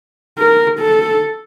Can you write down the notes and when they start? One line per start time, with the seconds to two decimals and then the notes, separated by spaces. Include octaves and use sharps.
0.38 A#4
0.80 A4